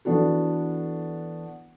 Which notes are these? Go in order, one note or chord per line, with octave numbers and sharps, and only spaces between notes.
E3 B3 D4 F#4 A4